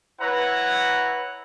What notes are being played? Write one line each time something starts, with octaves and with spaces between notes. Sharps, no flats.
E4 B4 C#5 F#5 A#5